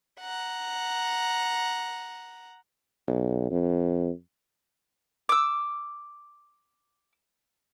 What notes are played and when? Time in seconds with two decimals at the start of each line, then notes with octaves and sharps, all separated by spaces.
0.20 F#5 A#5
3.08 B1
3.51 F2
5.29 D6 E6